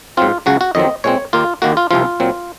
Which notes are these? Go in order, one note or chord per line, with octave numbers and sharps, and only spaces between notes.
G#2 F#3 C4 F4
C#2 C#3 F#3 F#4
F#4
F2 D#3 F#3 C4 D#5
A#2 G#3 C4 C#5
D#2 D#3 A#3 F4
D#2 D#3 A#3 F#4
F4
C2 C3 F3 F4
A#2 F#3 C4